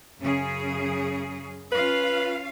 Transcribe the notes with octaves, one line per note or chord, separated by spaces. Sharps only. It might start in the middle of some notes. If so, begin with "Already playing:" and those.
F#2 C#3 G#4
C#4 F4 B4 F5